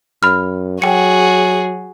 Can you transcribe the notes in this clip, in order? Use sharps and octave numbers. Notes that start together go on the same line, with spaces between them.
F#2 B5 F6
F#3 F#4 G#4 G5 C#7